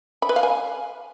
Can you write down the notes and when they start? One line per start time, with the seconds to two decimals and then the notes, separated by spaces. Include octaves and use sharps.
0.22 B5
0.29 B4
0.36 F5
0.43 G#5